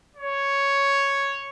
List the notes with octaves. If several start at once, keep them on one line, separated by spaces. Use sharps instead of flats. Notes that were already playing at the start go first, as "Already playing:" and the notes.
C#5